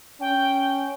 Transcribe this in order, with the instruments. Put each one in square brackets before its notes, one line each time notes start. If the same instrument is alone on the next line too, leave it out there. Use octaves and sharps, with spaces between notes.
[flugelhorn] C#4 [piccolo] G5